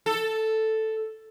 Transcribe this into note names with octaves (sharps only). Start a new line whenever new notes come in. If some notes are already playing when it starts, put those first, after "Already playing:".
A4